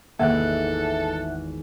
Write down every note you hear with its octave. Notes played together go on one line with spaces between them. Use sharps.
G#1 E2 A#3 A4 E5 F#5 F#6